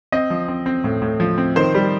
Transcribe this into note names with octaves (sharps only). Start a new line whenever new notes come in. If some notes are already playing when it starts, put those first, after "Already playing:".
C4 D#5
F3
C4
C4
A2
A2
F3
C4
D#3 C5
G3